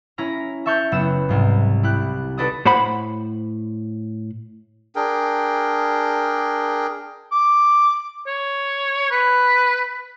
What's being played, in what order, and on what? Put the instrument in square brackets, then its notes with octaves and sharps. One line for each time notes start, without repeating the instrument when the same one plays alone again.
[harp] C#4 E4 A#5 F6
E5 A5 C#6 F6 G6
F#1 B3 E6 E7
C2 G#2
E4 G4 F#6
D#4 F#4 A4 B4 D5 D#6
[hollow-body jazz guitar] A2 C5 F#5 B5
[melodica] D4 G#4 A#4 G5
[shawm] D6
C#5
B4